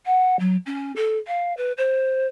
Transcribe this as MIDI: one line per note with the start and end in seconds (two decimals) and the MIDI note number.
0.05 0.38 78
0.39 0.56 54
0.66 0.92 61
0.96 1.17 69
1.27 1.53 77
1.57 1.72 71
1.77 2.27 72